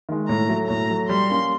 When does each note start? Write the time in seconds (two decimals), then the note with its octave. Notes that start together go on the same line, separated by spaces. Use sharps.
0.09 D#3 G#3
0.28 A2 A#5
0.49 F#3 A3
0.68 A2 A#5
0.90 F#3 A3
1.09 G3 C6
1.30 A#3 C#4